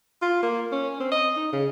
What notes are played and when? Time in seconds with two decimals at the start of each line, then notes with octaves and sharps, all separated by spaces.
0.22 F4
0.42 A#3
0.72 C#4
1.00 C4
1.11 D#5
1.36 D#4
1.52 C#3